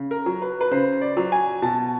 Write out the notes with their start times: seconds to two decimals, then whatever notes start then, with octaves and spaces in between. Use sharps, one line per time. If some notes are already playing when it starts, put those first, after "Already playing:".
Already playing: C#3
0.11 A#4
0.26 F#3
0.42 B4
0.61 B4
0.71 C#3 C5
1.01 D5
1.17 F#3
1.32 G#5
1.62 B2 A5